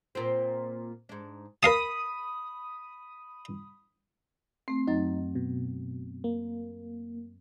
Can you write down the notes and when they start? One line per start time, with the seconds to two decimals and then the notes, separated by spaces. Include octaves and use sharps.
0.15 A#2 C4
1.09 G#2 D4
1.63 A#4 F5 A5 B5 D#6
4.68 A3 C4 C7
4.87 F#2 F#3 D#4 A6
5.35 B2
6.24 A#3